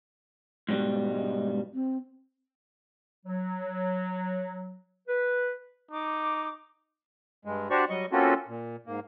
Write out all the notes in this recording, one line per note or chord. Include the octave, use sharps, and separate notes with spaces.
G#2 B2 G3
G#3
C4
F#3
B4
D#4 D6
G2 G#3
D4 F#4 G4 C5 D5 C#6
F#3 G3 D#5 C#6
A#3 C4 C#4 F4 F#4 A4
A#2
G#2 A#3